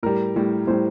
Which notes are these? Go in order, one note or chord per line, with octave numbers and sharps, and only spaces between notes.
A2 G3 A#4
A2 G3
A2 G3 C5